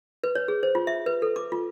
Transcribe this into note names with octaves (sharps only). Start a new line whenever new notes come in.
B4
C#5
G#4
C5
F4
E5
B4
A4
D6
F4